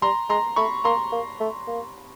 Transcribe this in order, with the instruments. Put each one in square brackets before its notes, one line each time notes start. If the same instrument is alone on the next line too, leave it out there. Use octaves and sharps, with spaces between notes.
[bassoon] G3 [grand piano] A#5 C6
[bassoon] G#3 [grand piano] A#5 C6
[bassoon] A3 [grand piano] B5 C#6
[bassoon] A#3 [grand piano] A#5 C6
[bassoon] A#3
A3
A#3